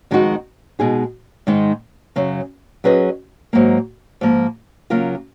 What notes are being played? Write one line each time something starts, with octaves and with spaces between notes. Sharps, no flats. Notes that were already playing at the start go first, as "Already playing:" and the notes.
F2 D#3 G#3 D#4 F#4
B2 G#3 D#4 G#4
G#2 D#3 G#3 D#4
F#2 C#3 F#3
F#3 C#4 G#4 B4 D#5
G#2 F#3 A#3
G#2 F3 A#3
C#3 F#3 A#3 F4 A#4